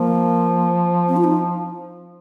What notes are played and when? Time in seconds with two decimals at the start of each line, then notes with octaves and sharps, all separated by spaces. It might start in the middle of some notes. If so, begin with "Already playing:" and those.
Already playing: F3 A#3
1.08 C4
1.17 F4
1.24 D#4